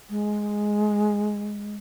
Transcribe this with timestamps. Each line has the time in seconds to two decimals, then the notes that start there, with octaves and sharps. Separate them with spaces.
0.10 G#3